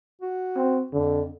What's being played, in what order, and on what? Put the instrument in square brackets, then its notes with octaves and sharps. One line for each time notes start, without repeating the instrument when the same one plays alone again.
[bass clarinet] F#4
[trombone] C4
[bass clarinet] F2 [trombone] D3